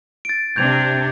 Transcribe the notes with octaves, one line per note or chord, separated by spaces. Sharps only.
A6 D7
C3 D4 G6 G#6 F7